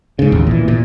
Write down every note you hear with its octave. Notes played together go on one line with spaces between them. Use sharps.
G#2 C#3
A1 D#2
A#2 E3
A#2